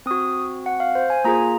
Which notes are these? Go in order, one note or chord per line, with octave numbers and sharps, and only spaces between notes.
C4 F#4 D#6
F#5
F5
C5
G#5
A#3 F4 G#4 A#5